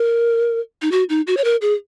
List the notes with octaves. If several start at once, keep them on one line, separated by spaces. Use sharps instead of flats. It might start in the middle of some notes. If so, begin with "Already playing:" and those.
Already playing: A#4
D#4
F#4
D#4
F#4
C#5
A#4
G#4